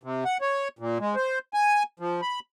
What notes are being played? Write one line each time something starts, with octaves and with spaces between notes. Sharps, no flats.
C3
F#5
C#5
A#2
G#3
C5
G#5
F3
B5